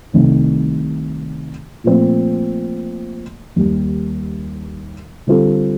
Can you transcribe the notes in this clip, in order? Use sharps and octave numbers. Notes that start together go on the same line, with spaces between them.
C2 C3 D#3 A3
A#2 F3 A3 C4
D#2 D#3 G3
D3 G3 C4 F4 A4